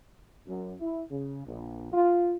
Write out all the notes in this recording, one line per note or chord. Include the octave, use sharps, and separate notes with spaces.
F#2
E4
C#3
A#1
F4